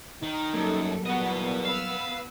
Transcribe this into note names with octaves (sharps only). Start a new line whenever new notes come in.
D#3 D#4
F#2 F#3 G3 A#3 A4
E2 A#2 B3 F#4 D#5
B3 B4 F5 E6